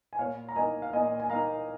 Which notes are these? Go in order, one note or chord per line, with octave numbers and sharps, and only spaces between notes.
G#5
A#2 C#5 F5
A#5
A#3 D#4 D#5 G#5
F5
A#2 D#5 G#5
G#5
A#3 D#4 F5 A#5